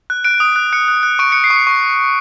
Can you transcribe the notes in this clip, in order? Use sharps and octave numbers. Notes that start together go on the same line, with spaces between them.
F#6
F#6 D7
D#6
F#6
F#6 C#7
F#6
F#6
C#6 D7
F#6 C#7
C7
C#6
C#7
C#6